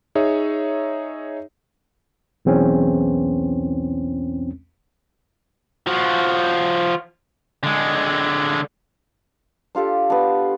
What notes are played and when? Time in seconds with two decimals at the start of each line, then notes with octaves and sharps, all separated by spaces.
0.15 D#4 G#4 C#5 E5
2.45 B1 E2 C4 C#4
5.87 F3 F#4
7.63 D3 G#3
9.75 D4 F4 G4 A4
10.10 B3 D4